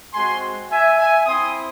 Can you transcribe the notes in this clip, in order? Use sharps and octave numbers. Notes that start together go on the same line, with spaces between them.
G#3 C4 F#4 G#5 C6
E5 G#5
E5 G#5
C4 E4 C6 D#6